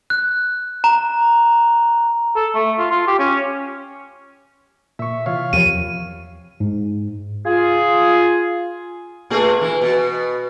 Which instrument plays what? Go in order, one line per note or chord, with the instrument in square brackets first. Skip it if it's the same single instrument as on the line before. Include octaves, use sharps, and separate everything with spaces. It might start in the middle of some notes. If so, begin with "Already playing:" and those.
[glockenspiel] F#6
A#5
[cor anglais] A4
A3
F4
F4
G4
C#4
[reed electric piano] A#2 C#6 [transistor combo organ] E5
[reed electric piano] C3 E3 F4 [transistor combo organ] C#5 F5
[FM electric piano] E2 F3 [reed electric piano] C4 G4 A#4 [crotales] D#7
[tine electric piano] G#2
[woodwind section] F4 G#4
[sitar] A#2 A3 G#4
E3
B2